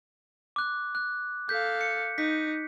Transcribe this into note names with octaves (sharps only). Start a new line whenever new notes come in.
D6 F#6
F#6
A4 F5 G6 B6
C#7
D#4 B6